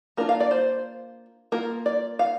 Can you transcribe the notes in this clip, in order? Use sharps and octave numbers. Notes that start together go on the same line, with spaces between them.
A#3 D4 F4 A#4
F5
D5
C5
A#3 F4 A#4
D5
F5